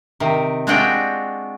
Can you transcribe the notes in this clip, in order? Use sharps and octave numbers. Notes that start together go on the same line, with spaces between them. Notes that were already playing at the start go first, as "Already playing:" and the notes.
C3 D#3
G#3 C4 D4 F4 F#4 G5